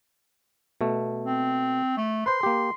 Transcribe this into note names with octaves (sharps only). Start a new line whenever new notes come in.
B2 A3
C4
A3
B4 C5 C6
A#3 G4